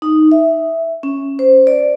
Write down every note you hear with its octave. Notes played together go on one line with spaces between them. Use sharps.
D#4
E5
C#4
C5
D5